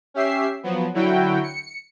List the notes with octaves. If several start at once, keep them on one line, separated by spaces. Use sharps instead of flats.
C#4 G4 E5 C7
F3 F#3 B3
D3 F#3 E4 F#4 G5
C#7